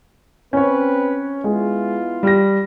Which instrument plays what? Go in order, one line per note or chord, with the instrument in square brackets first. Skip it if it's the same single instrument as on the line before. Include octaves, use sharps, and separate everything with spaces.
[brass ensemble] C4 B4 [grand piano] C#4 C#5
[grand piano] G#3 [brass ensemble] B3 E4 F4
[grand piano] G3 A#6